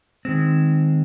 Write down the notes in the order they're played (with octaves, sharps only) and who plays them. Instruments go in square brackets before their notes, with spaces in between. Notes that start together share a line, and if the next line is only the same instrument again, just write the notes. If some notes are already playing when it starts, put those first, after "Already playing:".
[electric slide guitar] D#3 G#3 C4